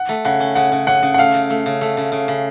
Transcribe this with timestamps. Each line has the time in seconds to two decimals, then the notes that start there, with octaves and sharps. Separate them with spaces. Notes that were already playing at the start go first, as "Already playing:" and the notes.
Already playing: F#5
0.09 A3
0.25 C#3 F#5
0.40 C#4
0.55 C#3 F#5
0.72 C#3
0.87 C#4 F#5
1.03 C#3
1.14 F#5
1.18 A3 F5
1.34 C#3
1.50 A3
1.66 C#3
1.81 A3
1.97 C#3
2.12 C#3
2.28 C#3